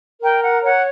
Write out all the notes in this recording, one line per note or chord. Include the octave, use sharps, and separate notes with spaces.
A#4 G5
F#5
C#5 F#5